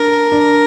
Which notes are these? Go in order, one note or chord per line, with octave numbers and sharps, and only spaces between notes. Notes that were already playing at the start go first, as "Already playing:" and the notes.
Already playing: D4 A#4
D4